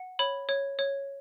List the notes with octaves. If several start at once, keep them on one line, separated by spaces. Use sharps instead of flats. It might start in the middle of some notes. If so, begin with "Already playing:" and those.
Already playing: F#5
C#5 B5
C#5
C#5